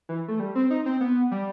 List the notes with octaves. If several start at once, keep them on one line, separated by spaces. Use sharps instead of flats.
E3
A3
G3
C4
D#4
C4
B3
G3